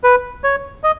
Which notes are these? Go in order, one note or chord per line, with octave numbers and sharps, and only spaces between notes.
B4
C#5
D#5